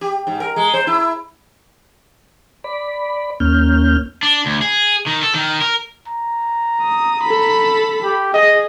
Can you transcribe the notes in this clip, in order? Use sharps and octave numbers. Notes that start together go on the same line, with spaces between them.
G4
G#2
A#4
G#3
C5
E4
D5 B5
D#2 A#3 C#4 F6 G6
D4
D2
G#4
D#3
A4
D#3
A#4
A#5
D#6
A4 B5
G4
G#4 D#5